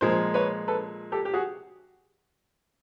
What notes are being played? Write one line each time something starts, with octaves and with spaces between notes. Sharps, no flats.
A#2 F3 G#3 A#4 C5
B4 C#5
A4 B4
G4 A4
G4
F#4 G#4